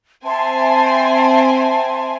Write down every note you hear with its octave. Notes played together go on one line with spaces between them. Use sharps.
C4 E5 G#5 A5 C6